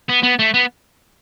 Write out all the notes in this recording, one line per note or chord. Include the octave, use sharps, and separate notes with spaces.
B3
B3
A3
B3